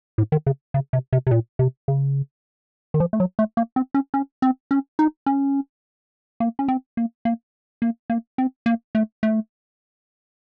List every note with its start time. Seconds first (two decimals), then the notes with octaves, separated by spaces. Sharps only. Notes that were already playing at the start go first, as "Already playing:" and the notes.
0.18 A2
0.32 D#3
0.47 C#3
0.74 C#3
0.93 C3
1.13 C3
1.27 C3
1.31 A#2
1.59 C3
1.88 C#3
2.94 D#3
3.00 F3
3.13 A3
3.20 F#3
3.39 A3
3.57 A#3
3.76 C4
3.94 C#4
4.14 C#4
4.42 C4
4.71 C#4
4.99 D#4
5.26 C#4
6.40 A#3
6.59 C#4
6.68 C4
6.97 A#3
7.25 A#3
7.82 A#3
8.10 A#3
8.38 C4
8.66 A#3
8.95 A3
9.23 A3